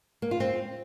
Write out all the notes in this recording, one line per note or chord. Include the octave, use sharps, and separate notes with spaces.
A#3
F4
C4